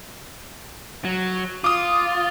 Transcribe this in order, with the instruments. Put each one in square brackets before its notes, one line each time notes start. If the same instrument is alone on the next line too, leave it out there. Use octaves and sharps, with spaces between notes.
[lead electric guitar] F#3
[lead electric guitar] F4 [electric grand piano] D6 D#6